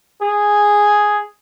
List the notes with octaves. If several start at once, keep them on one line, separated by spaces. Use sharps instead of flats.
G#4